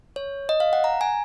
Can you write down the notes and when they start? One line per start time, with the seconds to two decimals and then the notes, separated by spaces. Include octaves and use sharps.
0.16 C#5
0.49 D#5
0.60 F5
0.73 F#5
0.84 A#5
1.01 G#5